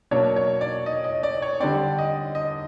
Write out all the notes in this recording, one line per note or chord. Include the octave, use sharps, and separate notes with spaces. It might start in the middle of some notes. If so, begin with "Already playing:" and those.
B2 F#3 A#3 D4 C#5
C#5
D5
D#5
D#5
D5
C#5
D3 G3 C4 D5
D#5
D#5